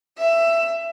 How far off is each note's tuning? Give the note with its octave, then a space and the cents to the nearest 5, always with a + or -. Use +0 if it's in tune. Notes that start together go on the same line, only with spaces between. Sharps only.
E5 +15